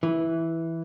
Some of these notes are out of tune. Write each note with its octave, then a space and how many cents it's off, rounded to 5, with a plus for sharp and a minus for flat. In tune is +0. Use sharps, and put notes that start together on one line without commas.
E3 -5